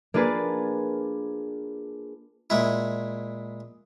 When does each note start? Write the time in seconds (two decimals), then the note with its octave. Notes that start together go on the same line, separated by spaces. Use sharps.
0.14 A#3 D4 F4 G#4 B4 A5
2.50 A#2 G#3 E4